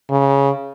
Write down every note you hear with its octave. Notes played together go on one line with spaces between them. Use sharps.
C#3